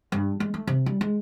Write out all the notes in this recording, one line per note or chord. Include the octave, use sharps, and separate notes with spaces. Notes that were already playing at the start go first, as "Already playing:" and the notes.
G2
G#3
A3
C3
G3
G#3